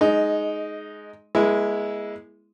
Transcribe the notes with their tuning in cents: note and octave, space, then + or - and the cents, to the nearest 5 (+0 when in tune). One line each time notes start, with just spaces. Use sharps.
G#3 +15 D#4 +0
G#3 +0 B3 -45 E4 +0